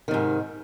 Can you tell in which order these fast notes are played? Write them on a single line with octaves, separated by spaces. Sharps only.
D#3 C3 G#2